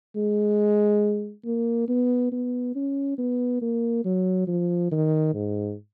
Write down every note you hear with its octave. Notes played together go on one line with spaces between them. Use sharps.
G#3
A#3
B3
B3
C#4
B3
A#3
F#3
F3
D#3
G#2